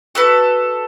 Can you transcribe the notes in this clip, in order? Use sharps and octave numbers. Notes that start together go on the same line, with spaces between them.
F#4 A4 B4